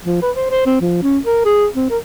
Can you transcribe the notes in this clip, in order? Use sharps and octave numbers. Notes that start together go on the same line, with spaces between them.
F3
B4
C5
C5
C4
F3
C#4
A#4
G#4
C4
A#4